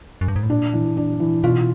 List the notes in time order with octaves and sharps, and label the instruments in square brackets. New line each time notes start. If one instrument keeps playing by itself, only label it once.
[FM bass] F#2
G2
G#2
A2
[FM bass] A#2 [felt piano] D4
[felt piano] E3
D4
E3
[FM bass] B2 [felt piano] F4